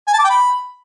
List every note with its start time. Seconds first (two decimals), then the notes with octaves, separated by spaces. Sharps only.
0.08 G#5
0.13 A5
0.19 D6
0.24 G5
0.30 B5